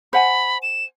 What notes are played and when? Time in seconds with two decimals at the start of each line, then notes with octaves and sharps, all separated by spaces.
0.13 C5 F#5 G#5 B5
0.63 E7